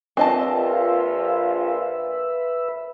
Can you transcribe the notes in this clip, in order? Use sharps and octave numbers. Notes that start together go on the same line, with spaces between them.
A#1 C4 F4 B4 D#5 E5 A5